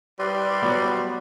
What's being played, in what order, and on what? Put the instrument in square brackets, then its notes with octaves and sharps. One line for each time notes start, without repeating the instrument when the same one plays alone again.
[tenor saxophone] G3 [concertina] B4 D5 C6
[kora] F#3 B3